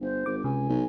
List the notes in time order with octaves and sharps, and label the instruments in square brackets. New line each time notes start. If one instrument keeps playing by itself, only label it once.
[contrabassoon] G1 [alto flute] C5
[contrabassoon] G#1 [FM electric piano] D6
[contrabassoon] C#2 [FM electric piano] C3 [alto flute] G#5
[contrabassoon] B1